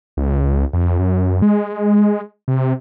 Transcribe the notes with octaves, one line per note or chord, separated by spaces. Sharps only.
C#2
F2
F#2
G#3
C3